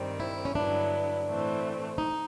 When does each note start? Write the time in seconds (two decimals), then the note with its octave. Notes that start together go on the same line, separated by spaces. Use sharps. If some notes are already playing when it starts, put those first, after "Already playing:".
Already playing: G2 D#3 G3 C4
0.20 E4
0.45 C#4
0.55 G2 D3 F#3 B3 D4 E4
1.27 A2 E3 A3 C4
1.98 D#4